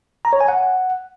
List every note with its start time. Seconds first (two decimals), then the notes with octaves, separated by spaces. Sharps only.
0.25 A#5
0.33 C#5
0.41 G#5
0.48 F#5